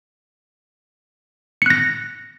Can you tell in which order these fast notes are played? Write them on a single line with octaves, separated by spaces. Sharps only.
C#7 F#6 A#6